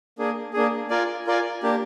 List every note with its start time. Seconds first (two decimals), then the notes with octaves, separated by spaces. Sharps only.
0.18 A#3 D4 G#4
0.53 A#3 D4 G#4
0.90 F4 A#4 D5 G#5
1.27 F4 A#4 D5 G#5
1.62 A#3 D4 G4